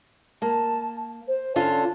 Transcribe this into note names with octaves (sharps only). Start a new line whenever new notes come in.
A#3 A5
C5
D3 C#4 F4 A5